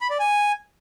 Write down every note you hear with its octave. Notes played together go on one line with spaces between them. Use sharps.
B5
D5
G#5